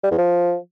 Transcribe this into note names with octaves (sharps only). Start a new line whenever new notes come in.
G3
E2
F3